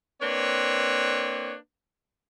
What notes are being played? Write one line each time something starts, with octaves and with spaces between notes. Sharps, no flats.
A#3 C4 D4 B4 C#5